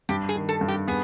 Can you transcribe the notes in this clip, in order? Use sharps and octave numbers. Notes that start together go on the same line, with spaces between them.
G2 G4
G#4
D#3
A4
G2
G4
B3 G#4